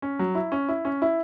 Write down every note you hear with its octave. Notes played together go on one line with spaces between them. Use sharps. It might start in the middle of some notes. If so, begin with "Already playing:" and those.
C#4
F#3
E4
C#4
E4
C#4
E4